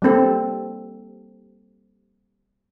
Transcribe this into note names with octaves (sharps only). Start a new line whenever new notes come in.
G3 A#3 C4 A4